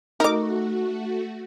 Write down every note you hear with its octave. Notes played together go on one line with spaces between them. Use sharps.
A3 D#4 F#4 A#4 D#5 D6